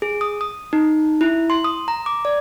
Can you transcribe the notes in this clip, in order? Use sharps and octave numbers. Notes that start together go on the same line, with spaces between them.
G#4
D#6
D#6
D#4
E4
C6
D#6
A#5
D6
D5